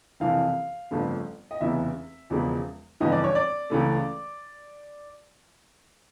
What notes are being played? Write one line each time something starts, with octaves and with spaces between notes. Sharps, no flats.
F#1 F2 C3 E3 F5
G1 F2 C#3 F3 A3
D#5
F1 E2 C#3 E3 E5
E1 E2 C#3 F3 G#3
G1 F2 C#3 E3 D#5
D5
C#5
D5
C#2 C#3 E3 A3